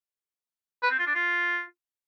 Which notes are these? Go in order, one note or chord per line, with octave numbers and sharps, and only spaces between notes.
B4
C4
F4
D4
F4